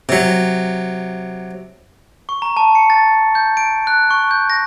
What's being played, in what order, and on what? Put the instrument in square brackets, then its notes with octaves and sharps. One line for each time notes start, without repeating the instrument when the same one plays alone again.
[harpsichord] C3 F#3
[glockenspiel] C#6
A#5
A5
C#7
A6
G6
D7
F#6
C#6
G6
A#6